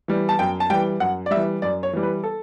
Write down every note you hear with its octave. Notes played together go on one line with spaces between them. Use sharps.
E3 G3
A5
F#2 G5
A5
E3 G3 G5
F#2 F#5
D5
G3 E5
E3
F#2 D5
C#5
E3 G3
B4
A4